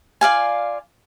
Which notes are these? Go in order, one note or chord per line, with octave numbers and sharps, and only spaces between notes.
F4 D5 F5 G#5